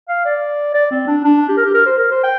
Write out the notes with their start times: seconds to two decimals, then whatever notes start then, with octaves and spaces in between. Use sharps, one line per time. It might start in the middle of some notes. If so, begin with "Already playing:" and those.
0.09 F5
0.25 D5
0.74 D5
0.91 C4
1.08 D4
1.24 D4
1.49 G4
1.57 A#4
1.65 G4
1.74 A#4
1.86 C5
1.98 A#4
2.11 C5
2.23 G5